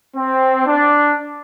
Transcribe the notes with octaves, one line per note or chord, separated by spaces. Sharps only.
C4
D4